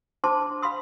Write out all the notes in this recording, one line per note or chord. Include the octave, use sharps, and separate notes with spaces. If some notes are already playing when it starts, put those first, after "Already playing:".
D4 C5 A5 C6 D6
F5 B5 C6 D#6